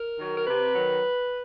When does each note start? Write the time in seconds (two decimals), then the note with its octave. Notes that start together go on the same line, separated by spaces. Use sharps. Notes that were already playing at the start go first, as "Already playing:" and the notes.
Already playing: A#4
0.18 D#3 F#3
0.37 A#4
0.46 C3 B4
0.73 D#3 F#3